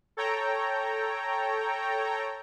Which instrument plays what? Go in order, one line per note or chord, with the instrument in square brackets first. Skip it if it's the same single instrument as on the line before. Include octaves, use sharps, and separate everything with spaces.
[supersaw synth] A4 C#5 G5 A#5